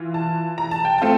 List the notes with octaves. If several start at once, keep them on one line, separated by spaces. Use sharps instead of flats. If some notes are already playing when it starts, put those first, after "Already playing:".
Already playing: E3 F4
A5
A#5
A5
G5
A3 C4 F4 A5